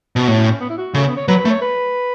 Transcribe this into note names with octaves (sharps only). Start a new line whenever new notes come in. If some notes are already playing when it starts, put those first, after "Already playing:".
B2
A2 F#4
C#4
C#4
B3
E4
F#4
C#3 A3
B3
C#5
F#3 B4
B4
A3
C#5
B4